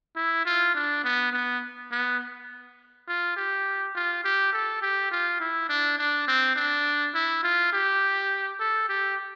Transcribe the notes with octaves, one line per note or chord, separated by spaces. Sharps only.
E4
F4
D4
B3
B3
B3
F4
G4
F4
G4
A4
G4
F4
E4
D4
D4
C4
D4
E4
F4
G4
A4
G4